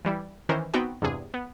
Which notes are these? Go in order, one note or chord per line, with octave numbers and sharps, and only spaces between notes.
E3 G3 E4
D#3 E3 C#4 A#4 C5
B3 C4 D#4 F#4 G5
E2 G2 C3 G#4
B3